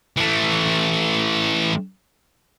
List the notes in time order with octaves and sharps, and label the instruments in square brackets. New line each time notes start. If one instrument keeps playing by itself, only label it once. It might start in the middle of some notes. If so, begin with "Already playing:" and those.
[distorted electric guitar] E3 A3